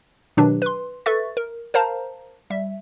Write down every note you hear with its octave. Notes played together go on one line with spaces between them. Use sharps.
B2 D#3 F#3 D4 G4 B4
B4 C6
A4 B4 E5 C#6 A6
A#4
A#4 C5 F5 A5 A#5
G3 E5